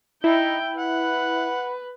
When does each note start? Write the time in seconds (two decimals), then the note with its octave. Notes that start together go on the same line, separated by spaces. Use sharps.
0.24 D#4 E4 G5
0.77 B4 F#5